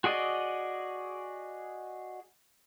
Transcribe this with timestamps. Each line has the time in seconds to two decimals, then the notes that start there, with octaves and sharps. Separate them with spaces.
0.04 F#4 G#4 D5 D#5